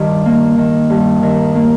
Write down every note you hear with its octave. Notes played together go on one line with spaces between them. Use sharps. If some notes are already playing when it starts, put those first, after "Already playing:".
Already playing: G2 D#3 D5
A#3
D#3
G2
D#3 A#4
A#3